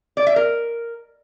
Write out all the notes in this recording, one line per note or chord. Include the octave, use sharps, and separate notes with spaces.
D5
E5
A#4